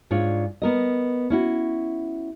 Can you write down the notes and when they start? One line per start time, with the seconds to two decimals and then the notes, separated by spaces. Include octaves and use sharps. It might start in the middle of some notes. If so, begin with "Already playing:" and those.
0.11 G#2 D4 F4 C#5
0.62 B3 A#4 D#5
1.30 C#4 E4 F#4